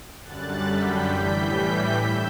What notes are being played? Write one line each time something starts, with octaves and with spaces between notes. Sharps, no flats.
F#2 D3 G3 F#6 A6
G6 B6
A2 E3 G3 G6 B6
G2 E6 G6